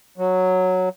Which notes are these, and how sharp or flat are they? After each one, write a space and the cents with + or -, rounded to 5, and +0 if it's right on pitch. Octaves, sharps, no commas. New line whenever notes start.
F#3 -5